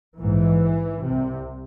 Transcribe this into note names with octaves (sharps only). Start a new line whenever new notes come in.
A#1 G#2 E3
C2 C3